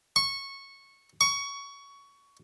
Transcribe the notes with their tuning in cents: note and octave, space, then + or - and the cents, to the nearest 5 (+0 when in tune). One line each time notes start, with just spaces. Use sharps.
C#6 -15
C#6 +15